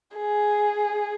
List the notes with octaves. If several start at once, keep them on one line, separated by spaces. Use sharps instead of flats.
G#4